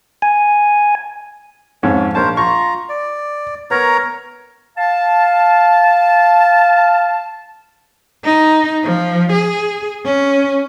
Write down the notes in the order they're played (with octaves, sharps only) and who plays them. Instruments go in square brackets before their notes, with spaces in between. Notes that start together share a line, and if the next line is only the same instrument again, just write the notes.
[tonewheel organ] G#5
[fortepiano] F2 G#2 C#4 [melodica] C#5
[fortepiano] A#1 A5 [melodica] A#4 C5 C#5
[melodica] F4 A#5 [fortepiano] C#6
[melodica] D5
[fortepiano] B3 [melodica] A#4 C#5 A#5
[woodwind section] F5 A5
[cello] D#4
F3
G#4
C#4